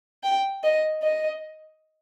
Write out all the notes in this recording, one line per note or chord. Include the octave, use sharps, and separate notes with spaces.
G5
D#5
D#5